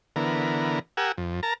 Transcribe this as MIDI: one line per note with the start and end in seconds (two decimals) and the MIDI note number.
0.16 0.79 50
0.16 0.79 52
0.16 0.79 59
0.16 0.79 70
0.97 1.12 67
0.97 1.12 70
0.97 1.12 78
0.97 1.12 80
0.97 1.12 88
1.18 1.41 41
1.43 1.54 70
1.43 1.54 81
1.43 1.54 82